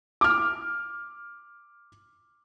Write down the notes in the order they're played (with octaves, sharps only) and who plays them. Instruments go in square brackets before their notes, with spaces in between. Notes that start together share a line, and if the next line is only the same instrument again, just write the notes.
[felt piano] D6 F6